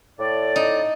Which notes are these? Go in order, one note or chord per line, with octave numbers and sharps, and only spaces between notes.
A2 D5
D#4